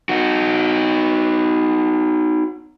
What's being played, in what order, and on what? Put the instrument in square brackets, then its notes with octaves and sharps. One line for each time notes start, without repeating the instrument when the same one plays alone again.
[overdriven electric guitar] D#4 F#4